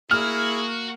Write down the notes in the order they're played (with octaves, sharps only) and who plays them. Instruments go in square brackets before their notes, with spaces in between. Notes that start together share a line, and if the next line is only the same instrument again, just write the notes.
[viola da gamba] A#3 [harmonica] E4 G#4 [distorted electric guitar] F#4 [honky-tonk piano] F6